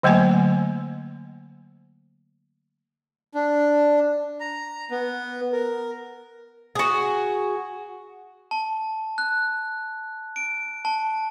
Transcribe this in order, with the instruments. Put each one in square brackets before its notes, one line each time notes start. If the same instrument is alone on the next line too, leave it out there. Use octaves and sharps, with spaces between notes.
[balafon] D3 F#3 A3 A#3 C5 G#5
[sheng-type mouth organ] D4
A#5
B3
A#4
[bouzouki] F#4 G#4
[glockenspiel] A5
F#6
D7
A5